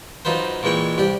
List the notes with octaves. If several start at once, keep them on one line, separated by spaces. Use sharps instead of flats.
F#2 D#4 F4 B4 C5
A#2 E3 G#3 G5 C#6
C2 G4 D5 D6